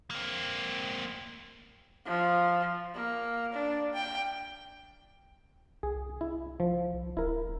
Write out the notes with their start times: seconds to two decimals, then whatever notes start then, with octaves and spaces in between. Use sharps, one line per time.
0.10 A#3 C4
2.06 F3
2.94 A#3
3.53 D4
3.94 G5
5.83 C2 G#4
6.21 E4
6.60 F3
7.17 D1 E4 A#4